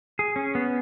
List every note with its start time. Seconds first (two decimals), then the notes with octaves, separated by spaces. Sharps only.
0.19 G#4
0.36 C#4
0.55 B3